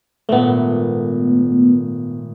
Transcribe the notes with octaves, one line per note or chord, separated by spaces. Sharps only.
G#1 A#2 A3 B3